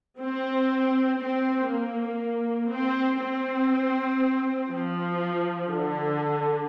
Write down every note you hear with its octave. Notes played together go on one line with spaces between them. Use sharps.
C4
C4
A#3
C4
C4
F3
D3